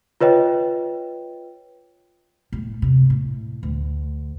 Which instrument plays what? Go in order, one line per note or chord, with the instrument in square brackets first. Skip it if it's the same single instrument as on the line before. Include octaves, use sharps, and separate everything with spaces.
[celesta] F4 B4 C#5 D#5 G5
[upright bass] A2
C3
A2
D2